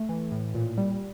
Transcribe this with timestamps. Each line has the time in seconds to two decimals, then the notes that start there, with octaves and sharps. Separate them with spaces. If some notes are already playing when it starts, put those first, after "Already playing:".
Already playing: A3
0.09 E3
0.32 A2
0.55 A#2
0.78 G3